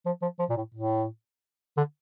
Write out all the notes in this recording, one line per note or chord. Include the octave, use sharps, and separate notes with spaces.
F3
F3
F3
A#2
A2
A2
D3